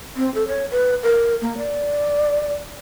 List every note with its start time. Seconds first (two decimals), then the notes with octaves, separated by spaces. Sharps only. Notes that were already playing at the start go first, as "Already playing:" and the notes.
0.17 C4
0.35 A4
0.48 C#5
0.71 B4
1.03 A#4
1.41 A#3
1.58 D5